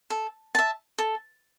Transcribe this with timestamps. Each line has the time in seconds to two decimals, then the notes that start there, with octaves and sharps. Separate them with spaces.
0.10 A4
0.55 E5 A5
0.98 A4